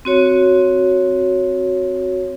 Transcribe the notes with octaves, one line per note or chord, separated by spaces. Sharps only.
C4 F#4 C#5